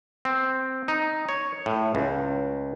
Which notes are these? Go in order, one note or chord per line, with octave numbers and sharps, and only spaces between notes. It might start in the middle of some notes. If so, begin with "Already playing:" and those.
C4
D#4
C#5
A2
C#2